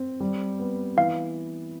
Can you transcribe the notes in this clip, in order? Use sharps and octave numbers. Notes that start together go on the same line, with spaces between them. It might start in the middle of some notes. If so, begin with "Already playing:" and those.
Already playing: C4
G3
B3
E3 F5